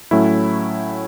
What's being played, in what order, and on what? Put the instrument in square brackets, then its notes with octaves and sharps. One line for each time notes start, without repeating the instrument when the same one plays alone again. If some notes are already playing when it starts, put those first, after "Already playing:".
[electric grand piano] A2 F#3 A3 C#4 E4